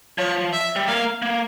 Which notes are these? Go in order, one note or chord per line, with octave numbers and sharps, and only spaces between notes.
F3 C#5
E5
G3
A#3 F5
A#3